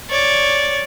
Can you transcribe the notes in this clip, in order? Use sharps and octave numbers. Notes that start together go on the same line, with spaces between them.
C#5 D5